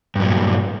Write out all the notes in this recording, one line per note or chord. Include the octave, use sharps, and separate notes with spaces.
G2 A#2 F#3